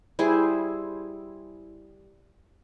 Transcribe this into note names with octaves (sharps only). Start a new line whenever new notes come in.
G3 E4 G#4 C5